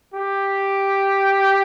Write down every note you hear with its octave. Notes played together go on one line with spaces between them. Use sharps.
G4